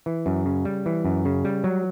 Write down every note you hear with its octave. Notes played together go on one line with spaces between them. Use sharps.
E3
F#2
C#3
G3
E3
F#2
C#3
G3
F#3